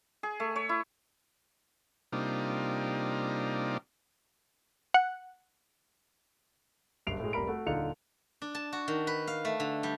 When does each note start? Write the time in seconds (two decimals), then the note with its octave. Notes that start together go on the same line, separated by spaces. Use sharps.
0.23 G#4
0.40 A3
0.56 C#5
0.69 E4
2.12 C3 G3 A#3 D4 D#4 F4
4.94 F#5
7.07 F#1 G2 C7 D7 F7
7.20 A2 G#3
7.33 F1 G3 A#4 B5 D7
7.47 A3 F#4
7.66 D#1 D3 D#4 F4 C#7 F7
8.42 D4
8.55 A5
8.73 F#4
8.88 D#3
9.07 B4
9.27 F5
9.45 A3
9.60 D3
9.83 G3